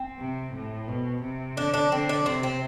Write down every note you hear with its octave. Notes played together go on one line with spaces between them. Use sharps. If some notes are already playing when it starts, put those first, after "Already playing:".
Already playing: C4
C3
A2
B2
C3
D3 D4
D4
D3 C4
D4
C3 C4
C4